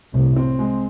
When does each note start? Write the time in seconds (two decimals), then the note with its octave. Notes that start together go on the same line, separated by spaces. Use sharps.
0.14 C2 A2 C3
0.36 C4
0.59 G#3